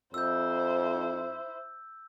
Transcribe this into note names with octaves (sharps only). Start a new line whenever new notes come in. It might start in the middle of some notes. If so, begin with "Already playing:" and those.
F2 E4 C5 E6 G6